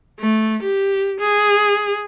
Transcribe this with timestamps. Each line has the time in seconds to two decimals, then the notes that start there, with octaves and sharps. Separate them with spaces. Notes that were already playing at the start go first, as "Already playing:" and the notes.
0.20 A3
0.63 G4
1.20 G#4